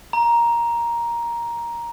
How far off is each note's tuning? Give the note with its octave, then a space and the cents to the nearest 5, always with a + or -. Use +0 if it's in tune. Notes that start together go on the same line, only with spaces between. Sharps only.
A#5 +10